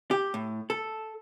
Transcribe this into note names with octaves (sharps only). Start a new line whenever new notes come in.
G4
A2
A4